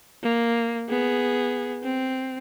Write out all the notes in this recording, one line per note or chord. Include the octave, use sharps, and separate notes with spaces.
A#3
B3 G#4
C4